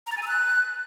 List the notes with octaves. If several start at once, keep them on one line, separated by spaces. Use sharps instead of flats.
A#5
A6
G#5
E6
F#6